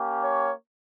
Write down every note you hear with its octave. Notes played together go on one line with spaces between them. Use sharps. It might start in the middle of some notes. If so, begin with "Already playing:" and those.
Already playing: A#3 C#4 G4
C#5